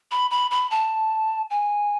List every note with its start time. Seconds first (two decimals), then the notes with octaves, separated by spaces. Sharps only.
0.11 B5
0.31 B5
0.51 B5
0.71 A5
1.50 G#5